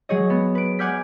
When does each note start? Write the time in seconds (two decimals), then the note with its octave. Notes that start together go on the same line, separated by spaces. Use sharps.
0.09 F#3 G#4 C#5 D#5
0.30 B3
0.55 B4 D7
0.79 F#5 G#5 D6 F6 G6 B6